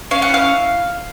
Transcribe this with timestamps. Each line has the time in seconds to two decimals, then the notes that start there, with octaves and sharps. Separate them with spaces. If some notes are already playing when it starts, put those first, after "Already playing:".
0.11 C#4 F5
0.22 F#5
0.29 E4 F5